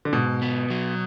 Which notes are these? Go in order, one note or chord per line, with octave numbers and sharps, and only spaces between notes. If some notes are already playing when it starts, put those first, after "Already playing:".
D3
G#2 B2
B3
F#3